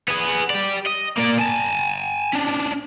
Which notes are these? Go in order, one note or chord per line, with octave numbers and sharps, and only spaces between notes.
B3 G#4
G4 D5
D#5
A#3 D5
G#5 A5
C#4 D4